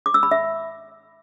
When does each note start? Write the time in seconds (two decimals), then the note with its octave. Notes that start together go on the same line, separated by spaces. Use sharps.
0.06 D6
0.14 E6
0.23 B5
0.31 E5